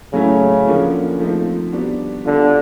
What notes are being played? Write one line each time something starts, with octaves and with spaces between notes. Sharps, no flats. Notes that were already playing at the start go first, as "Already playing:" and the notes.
A2 C#3 F#3 A3 C#4 E4
D3 F3 A#3 C#4
F3 A3 C4 D#4
G3 B3 D4 F#4
D3 G3 B3 D4 F4